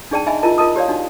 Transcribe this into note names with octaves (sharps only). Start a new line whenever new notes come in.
D4 D#4 G#4 D5 G5 A5
D#4 D#5 E5 G#5 B5
E4 F4 A#4 D#5 A5
F4 A#4 D#5 A5 D#6
G4 C#5 D5 F5
D4 D#4 F#4